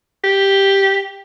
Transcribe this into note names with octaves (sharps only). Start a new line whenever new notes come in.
G4